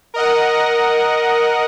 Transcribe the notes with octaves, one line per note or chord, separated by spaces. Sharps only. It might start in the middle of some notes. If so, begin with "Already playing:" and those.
A#4 D#5 F#5